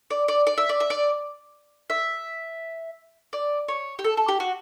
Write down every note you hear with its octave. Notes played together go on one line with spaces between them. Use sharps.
D5
D5
D5
E5
D5
E5
D5
E5
D5
C#5
G4
A4
A4
G4
F#4